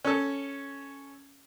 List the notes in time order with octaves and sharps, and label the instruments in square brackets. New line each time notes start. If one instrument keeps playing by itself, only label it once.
[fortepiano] C#4 A4